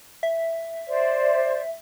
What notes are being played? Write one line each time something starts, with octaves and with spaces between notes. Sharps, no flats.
E5
C5 D5